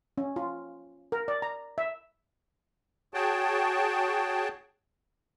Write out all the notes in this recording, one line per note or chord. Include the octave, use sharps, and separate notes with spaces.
C#4
F4
A#4
D5
A#5
E5
F#4 G#4 C#5 G5 A5